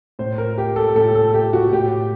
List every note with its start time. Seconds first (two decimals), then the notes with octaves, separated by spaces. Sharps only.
0.19 A2 C5
0.38 A#4
0.58 G4
0.76 A4
0.95 A2 A4
1.15 A4
1.34 G4
1.53 F#4
1.72 A2 G4